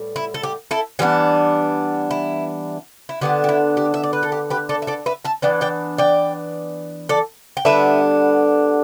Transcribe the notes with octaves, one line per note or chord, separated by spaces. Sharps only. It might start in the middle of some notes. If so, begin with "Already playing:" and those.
Already playing: A2 G3 B3
E4
A4
G4
E4 A4
E3 G3 B3 D4 G4
E4
E4
D3 B3 D4 G4
G4
E4
G4
E5
D5
B4
A4
G4
G4 B4
A4 D5
E5
A4 D5
B4 E5
E5 A5
E3 B3 D4 D5 G5
D5 G5
D5 G5
A4 D5
G5
D3 G3 B3 D4 B4 E5